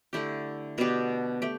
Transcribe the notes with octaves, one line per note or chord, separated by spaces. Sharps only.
D3 A3 E4 G4
B2 B3 D4 G4
A3 G4